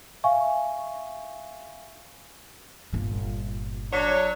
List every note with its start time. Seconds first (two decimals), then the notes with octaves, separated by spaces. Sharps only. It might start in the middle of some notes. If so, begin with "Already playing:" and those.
0.24 E5 F5 G#5 C#6
2.93 G1 A#2
3.92 F#3 D4 C#5